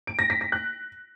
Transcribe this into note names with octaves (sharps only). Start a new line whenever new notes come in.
D7
A#6
B6
B6
F#6